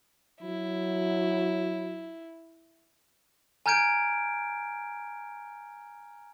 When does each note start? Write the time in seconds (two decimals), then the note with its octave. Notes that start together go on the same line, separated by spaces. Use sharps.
0.42 F#3 E4
3.66 G#5 A#5 F6 G6 G#6 D7